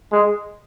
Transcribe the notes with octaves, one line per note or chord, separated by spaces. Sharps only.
G#3